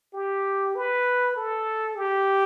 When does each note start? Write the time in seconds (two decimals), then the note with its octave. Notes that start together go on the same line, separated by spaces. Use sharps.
0.14 G4
0.75 B4
1.37 A4
1.97 G4